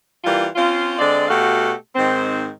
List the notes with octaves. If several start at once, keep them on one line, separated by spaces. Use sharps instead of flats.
E3 G3 A#3 F4
C4 C#4 F4
D3 G#3 C4 D5
B2 A3 F#4 G4 F5
G#2 D#3 C4